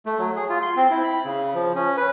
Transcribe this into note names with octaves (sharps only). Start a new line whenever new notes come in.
A3
F#3
G#4
F4
C6
C4
E4
B5
C#3
F3
C#4
B4